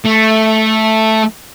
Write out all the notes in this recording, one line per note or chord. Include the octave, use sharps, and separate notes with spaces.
A3